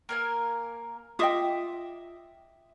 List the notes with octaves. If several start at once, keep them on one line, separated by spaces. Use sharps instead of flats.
A#3 A#4 G#5
F4 D#5 E5 G5 D6 D#6